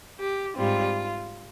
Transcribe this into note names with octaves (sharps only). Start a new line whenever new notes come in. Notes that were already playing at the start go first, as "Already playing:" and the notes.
G4
G#2 G3 C4 F4